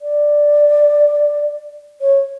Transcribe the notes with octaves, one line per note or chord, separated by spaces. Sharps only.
D5
C#5